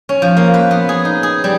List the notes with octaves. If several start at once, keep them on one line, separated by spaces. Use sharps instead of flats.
C#4
F3
A#3
B4
B3
G#4
D#4
G#4
G3